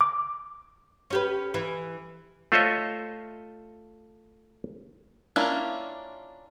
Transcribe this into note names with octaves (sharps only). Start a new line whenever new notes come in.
D6
C#4 G4 B4
E3
A3 F4 C5 C#5 D#5 E5
A#3 C#4 D4 E4 F4